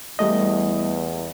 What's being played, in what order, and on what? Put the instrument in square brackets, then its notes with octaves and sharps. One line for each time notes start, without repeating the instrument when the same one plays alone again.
[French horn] E2 [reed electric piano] G3 A3 D#5